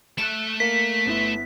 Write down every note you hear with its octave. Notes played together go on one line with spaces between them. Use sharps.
A3 E5 F#6 D7 E7
A#3 B6
G1 B3 E4